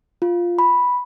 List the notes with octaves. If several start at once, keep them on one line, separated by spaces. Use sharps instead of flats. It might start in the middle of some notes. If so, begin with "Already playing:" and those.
F4
B5